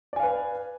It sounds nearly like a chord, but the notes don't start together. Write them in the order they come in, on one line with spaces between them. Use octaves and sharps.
D5 G#5 F5 B4